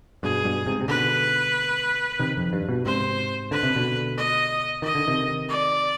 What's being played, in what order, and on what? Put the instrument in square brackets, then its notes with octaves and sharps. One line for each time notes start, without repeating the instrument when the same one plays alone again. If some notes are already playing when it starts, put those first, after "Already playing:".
[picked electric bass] G2 B2 [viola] G#4
[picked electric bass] G2 B2
G#2 C3
C3
[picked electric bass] B2 D3 [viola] B4
[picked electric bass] C3 D#3
F2
G2
G2 B2
[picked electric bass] G#2 C3 [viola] C5
[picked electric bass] D3 [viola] B4
[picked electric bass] C3
B2 D3
[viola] D#5
[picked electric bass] D#3 [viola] D#5
[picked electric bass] D3
C3 D#3
[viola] D5